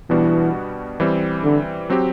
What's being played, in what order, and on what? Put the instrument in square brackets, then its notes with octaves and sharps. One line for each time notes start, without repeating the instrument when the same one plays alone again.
[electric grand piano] B2 G3 B3 D4 F#4 [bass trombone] E3
[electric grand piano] E3 G3 C4
[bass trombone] D3
[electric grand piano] F#3 C4 G4